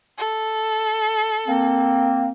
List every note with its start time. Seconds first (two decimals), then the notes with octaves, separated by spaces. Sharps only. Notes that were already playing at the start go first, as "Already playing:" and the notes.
0.18 A4
1.47 A#3 C4